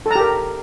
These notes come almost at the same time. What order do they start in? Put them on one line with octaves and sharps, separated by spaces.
A4 A#5 G4 A#4